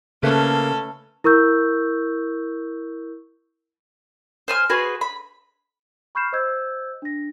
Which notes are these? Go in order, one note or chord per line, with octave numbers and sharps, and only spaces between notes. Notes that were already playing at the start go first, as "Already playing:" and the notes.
C#3 A3 A#3 C#4 A4 B4
E4 A#4 C#6 E6 G6
C5 G#5 F6
F#4 G#4 B4 C5
B5
B5 C#6 F6 G6 C7 E7
C5 D#5 E6 G6 G#6
D4 A#6